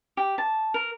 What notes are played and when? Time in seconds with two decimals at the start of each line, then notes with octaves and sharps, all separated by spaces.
0.17 G4
0.38 A5
0.74 A#4